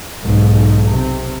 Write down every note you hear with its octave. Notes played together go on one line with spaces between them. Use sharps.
B1 G#2
C3